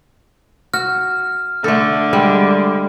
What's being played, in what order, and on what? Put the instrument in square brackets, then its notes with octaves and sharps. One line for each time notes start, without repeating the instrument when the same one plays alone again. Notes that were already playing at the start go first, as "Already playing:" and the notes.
[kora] F#4 [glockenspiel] F6
[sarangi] D3 [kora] A3 A4
[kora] G3 [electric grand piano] G#3